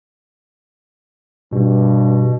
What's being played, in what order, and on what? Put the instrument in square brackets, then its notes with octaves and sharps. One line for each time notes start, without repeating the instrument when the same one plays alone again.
[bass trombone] G2 [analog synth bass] B2